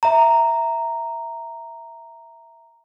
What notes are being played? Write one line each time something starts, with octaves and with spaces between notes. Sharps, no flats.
E5 A#5